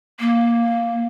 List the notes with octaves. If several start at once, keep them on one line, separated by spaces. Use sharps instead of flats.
A#3